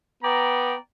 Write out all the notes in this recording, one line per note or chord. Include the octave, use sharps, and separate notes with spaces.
B3 D5 G5 A#5